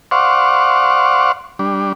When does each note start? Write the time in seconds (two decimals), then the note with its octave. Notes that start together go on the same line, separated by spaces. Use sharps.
0.11 C5 D5 F5 F#5 C#6
1.59 G3 D4